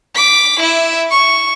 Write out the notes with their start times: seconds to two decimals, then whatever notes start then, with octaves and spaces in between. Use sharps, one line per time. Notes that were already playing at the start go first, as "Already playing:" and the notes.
0.15 D6 B6
0.60 E4 E5
1.11 C#6